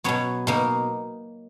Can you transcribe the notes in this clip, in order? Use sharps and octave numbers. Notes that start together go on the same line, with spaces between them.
B2 F#3 B3 C#5
B2 A#3 D#4